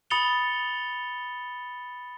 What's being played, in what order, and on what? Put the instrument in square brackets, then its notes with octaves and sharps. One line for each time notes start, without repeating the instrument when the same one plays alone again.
[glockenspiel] B5 D#6 A6 C#7 F7 G7